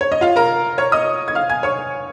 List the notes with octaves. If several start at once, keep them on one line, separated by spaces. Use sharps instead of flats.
C#5
D#5
F4 F5
A#4 A#5
C#5 C#6
D#5 D#6
G#6
F5 F6
G#5 G#6
C#5 C#6